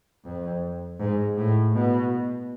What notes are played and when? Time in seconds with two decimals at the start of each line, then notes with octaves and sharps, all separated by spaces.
0.24 F2
0.99 G#2
1.37 A2
1.74 B2